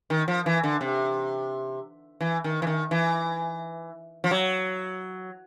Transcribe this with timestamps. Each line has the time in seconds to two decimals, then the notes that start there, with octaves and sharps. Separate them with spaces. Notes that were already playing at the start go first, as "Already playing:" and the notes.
0.10 D#3
0.28 F3
0.46 E3
0.63 D3
0.81 C3
2.21 E3
2.44 D#3
2.62 E3
2.67 D#3
2.91 E3
4.24 F3
4.31 F#3